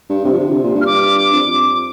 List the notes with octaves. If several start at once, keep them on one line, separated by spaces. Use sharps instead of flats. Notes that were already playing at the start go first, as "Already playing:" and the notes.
G2
C3
F3
D3
C3
A#2
G2
F6
D6
F2
F2